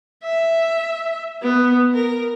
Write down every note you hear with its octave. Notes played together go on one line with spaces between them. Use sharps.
E5
B3
A#4